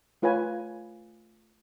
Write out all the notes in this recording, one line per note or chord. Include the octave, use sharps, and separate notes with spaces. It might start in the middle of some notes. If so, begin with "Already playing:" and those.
A3 F4 B4 C#5 G#5